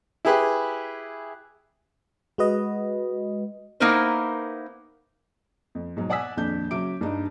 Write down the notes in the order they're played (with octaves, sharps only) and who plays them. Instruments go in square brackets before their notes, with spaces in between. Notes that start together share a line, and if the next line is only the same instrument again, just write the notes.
[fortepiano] E4 G4 G#4 B4
[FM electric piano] G#3 F#4 B4 D#5
[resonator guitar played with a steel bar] A#3 B3 D#4 E4 A#4 C5
[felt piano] F2
G#2 B2 F#3
D5 F#5 G#5 D#6 E6 B6
D#1 A#1 F2 D4 G6
C#3 F#3 E5 D6 D7
G2 D4 D#4